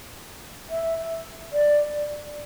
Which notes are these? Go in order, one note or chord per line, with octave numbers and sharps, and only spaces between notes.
E5
D5